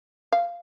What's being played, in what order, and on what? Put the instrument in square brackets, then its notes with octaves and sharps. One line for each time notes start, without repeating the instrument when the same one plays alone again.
[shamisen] F5